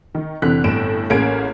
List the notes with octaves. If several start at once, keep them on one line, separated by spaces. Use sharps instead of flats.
D#3
F1 D3 E3 C4 F#6 B6
G1 A2 D7 E7
A1 A#3 C#4 G#4 G#6 D7